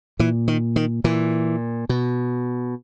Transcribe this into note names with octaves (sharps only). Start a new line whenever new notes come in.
A#2 E3
D#3
D#3
A#2 E3
B2